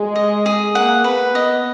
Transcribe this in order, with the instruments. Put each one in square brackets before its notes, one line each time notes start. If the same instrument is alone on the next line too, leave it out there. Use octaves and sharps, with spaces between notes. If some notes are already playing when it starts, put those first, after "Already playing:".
Already playing: [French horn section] G#3
[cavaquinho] D#5
G#4
[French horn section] A#3 [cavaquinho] F#5
[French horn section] B3 [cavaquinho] B4
[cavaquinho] D#5